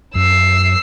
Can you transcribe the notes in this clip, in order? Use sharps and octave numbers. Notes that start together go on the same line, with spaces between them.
F#2 E6 C7